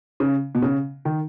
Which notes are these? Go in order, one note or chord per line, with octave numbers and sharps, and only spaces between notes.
C#3
B2
C#3
D#3